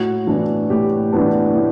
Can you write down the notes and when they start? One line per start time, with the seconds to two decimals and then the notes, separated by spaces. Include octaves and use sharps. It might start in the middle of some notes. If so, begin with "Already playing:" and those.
Already playing: A2 F#4
0.27 E3 B3 D4
0.70 A2 G4
1.13 E3 B3 D4
1.55 A2